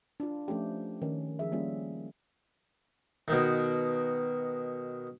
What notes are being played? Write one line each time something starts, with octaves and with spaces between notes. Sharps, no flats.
D4 F4
F3 A3 C#4 G4
D#3 C#4
F3 G#4 E5
G3 A#3 C#4 F4
B2 D#3